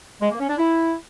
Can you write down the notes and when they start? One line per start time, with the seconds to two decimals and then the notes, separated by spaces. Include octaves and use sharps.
0.21 G#3
0.31 A#3
0.40 C#4
0.49 D4
0.58 E4